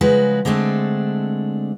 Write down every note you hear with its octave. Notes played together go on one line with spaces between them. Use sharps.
C#3 F3 G#3 F#4 B4
D3 G#3 A3 C4 D4